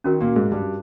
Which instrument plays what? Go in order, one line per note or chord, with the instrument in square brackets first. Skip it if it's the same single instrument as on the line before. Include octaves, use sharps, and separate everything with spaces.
[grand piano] D#3 D#4 [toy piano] C#4 F#4 A#4
[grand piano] A#2 A#3
G#2 G#3
G2 G3